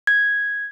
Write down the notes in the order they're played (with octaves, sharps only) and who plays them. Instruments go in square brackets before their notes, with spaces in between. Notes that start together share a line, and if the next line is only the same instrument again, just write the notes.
[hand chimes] G#6